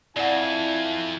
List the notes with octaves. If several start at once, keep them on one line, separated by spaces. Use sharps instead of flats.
F2 E4 D5 F#5 G#5